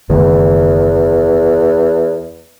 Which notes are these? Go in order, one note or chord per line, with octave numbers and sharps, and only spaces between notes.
F#1 E2 D#3 A3